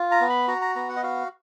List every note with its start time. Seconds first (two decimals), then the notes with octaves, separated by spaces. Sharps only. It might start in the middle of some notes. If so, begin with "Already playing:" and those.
Already playing: F4
0.11 A#5
0.21 B3
0.30 B5
0.48 F#4 A#5
0.61 A#5
0.76 B3 A#5
0.89 F#5
0.96 D#5
1.03 F#4 F5